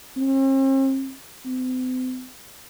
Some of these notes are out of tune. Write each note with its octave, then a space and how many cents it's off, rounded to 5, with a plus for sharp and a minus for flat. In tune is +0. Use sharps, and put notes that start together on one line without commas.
C4 +45
C4 -40